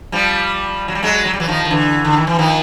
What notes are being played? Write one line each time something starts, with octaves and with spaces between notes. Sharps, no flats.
F3 G3
F#3
G3
F#3 G#3
F#3
G3
E3 F#3
D#3 F3
D#3
D3 E3
D3
D#3
E3
D#3 F3